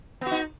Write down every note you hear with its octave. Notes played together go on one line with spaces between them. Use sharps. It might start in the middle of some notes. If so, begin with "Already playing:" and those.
B3 D#4 F#4